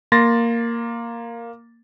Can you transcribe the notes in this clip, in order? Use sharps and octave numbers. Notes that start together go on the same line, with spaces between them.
A#3 C6 A6 A#6